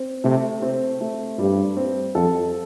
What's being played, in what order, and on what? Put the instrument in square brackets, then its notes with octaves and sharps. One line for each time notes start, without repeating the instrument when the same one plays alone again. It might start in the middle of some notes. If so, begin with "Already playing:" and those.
Already playing: [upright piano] C4
[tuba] C3 [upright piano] A3
[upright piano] C4
A3
[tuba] G2 [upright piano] G3
[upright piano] C4
[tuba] F2 [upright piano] A4